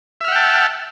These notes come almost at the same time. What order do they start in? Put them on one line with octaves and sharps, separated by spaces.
E5 F6 F#5 G5 A5